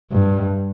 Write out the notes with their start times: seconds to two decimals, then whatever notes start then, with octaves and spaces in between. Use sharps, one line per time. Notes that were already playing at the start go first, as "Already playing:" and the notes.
0.12 G2